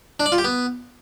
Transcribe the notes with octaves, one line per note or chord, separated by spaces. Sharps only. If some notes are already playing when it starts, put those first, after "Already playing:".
D4
D5
F4
G4
B3